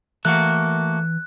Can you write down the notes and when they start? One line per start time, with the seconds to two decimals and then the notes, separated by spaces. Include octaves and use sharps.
0.25 E3 A3 A#3 F#4 F#6